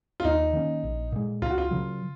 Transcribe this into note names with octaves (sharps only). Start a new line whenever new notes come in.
F4
D#2 D#4
D#3 A#3 C#4
A#1
A#2 G#3
C#2 F4
F#4
F4
C#3 F#3